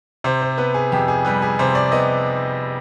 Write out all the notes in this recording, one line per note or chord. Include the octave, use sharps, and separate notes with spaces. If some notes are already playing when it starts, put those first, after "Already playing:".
C3 C5
C5
B3 B4
G#4
F2 G4
G#4
G3 B4
G#4
C3 C5
D5
B3 D#5